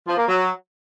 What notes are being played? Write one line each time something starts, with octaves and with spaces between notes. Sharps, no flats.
F3
A#3
F#3